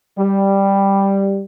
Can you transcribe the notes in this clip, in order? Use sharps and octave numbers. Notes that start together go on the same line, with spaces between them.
G3